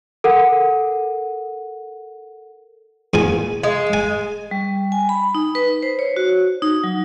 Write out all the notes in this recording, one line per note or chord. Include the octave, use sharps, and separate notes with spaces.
A4 A#4 F#5
E2 A#2 G#5
G#3
G#5
G3
G#5
B5
D#4
B4
C5
C#5
F#4
D#4
F#3